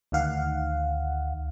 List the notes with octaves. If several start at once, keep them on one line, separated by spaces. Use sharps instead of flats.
D2 D#3 F5 F#5